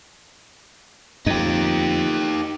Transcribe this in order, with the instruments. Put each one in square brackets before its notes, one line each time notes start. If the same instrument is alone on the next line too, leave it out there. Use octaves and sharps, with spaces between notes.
[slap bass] F2 [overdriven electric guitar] D#4 G4